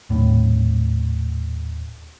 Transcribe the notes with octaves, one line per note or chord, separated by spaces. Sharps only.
D#1 A2